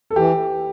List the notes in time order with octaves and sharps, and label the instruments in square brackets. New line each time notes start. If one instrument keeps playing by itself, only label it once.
[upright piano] A4
[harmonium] E3 [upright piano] G4